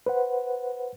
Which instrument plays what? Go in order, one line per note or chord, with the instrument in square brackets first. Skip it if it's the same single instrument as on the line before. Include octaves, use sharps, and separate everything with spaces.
[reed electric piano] B4 C5 F#5